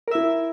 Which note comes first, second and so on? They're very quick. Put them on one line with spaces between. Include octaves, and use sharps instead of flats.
A#4 E5 E4